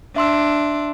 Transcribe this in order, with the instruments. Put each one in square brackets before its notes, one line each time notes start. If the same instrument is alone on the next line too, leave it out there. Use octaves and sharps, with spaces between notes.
[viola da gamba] D4 [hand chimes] E5 C6 E6